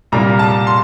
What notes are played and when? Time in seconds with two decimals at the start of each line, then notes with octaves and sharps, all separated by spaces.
0.12 C2 A#2 G3 A#3 A#5
0.39 A5
0.67 C6